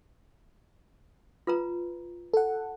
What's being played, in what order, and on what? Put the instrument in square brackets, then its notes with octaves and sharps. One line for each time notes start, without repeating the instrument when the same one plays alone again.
[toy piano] F4 B4 A#5
[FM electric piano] A4 F#5